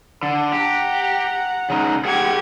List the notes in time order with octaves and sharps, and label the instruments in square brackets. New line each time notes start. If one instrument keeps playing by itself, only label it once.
[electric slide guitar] D3
[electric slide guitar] G4 [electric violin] F#5 A#5
[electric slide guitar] C#3 D#4
[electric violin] G4 G#6 [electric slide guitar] G#4 F#5 G5